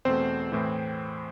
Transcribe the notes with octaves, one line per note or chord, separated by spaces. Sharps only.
E2 B2 A3 C4 C5
A2 E3